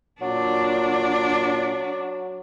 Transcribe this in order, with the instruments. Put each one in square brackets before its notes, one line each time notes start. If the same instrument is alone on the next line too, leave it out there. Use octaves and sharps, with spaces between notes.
[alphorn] A#2 [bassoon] F#3 [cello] D4